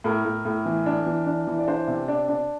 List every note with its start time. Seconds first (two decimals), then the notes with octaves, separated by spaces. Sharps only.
0.04 A2 A#4
0.24 A2
0.45 A2
0.65 E3
0.86 D4
1.06 E3
1.26 D4
1.47 E3
1.59 D5
1.68 D4 C5
1.87 C3
2.08 D4 D5
2.29 D4